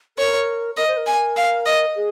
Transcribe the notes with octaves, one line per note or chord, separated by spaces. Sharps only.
A#4 C#5
A#4 D#5
C5
A#4
G#5
F5
D#5
G#4